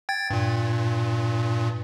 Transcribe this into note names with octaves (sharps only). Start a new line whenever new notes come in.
G5 G#6 A6
G2 A#2